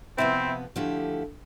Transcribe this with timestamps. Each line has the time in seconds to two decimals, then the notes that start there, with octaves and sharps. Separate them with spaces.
0.18 C3 F3 B3 C4 E4
0.76 D3 F3 A3 E4 G4